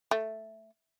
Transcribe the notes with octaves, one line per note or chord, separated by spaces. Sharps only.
A3